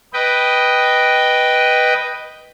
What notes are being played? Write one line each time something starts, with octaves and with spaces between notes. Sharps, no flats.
B4 D#5 G5